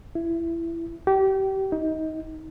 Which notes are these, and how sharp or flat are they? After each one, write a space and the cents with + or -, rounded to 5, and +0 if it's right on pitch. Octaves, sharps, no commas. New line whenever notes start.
E4 +20
G4 -30
D#4 +25